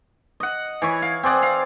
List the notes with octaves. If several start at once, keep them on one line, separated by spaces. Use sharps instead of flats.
D#5 F#5
E3 E4 C#5
F5
C4 G#4 D5 F#5
F5